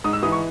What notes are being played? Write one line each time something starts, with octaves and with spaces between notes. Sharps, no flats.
G#2 D#6
E6
E3 D#6
C#6